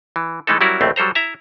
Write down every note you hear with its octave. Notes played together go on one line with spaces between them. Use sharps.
E3
E3 G#3 A3 D#4 A4
F#3 G3 C#4 E4 F#4 A#4
A#1 D#2 A2 A3 C4
F#3 G3 A4 C5 A#5
E4 E5 A#5